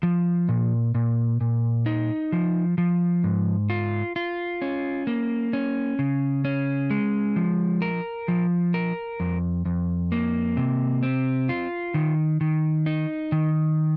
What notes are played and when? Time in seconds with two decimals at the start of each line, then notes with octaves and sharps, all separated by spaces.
0.03 F3
0.49 A#2
0.95 A#2
1.41 A#2
1.86 D#4
2.32 F3
2.78 F3
3.24 G#2
3.70 F4
4.16 F4
4.62 C#4
5.07 A#3
5.53 C#4
5.99 C#3
6.45 C#4
6.91 G#3
7.36 F3
7.82 A#4
8.28 F3
8.74 A#4
9.20 F2
9.65 F2
10.12 A#3
10.57 C3
11.03 C4
11.49 F4
11.94 D#3
12.41 D#3
12.86 D#4
13.32 D#3